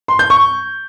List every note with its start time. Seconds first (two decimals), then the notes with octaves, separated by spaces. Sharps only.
0.08 C6
0.19 G6
0.30 C#6